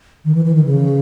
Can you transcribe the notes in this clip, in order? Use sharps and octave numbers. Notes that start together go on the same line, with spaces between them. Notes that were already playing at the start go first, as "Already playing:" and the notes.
D#3
E3
E3
D#3
C#3